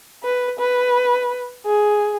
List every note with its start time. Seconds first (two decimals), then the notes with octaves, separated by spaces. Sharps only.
0.23 B4
0.59 B4
1.66 G#4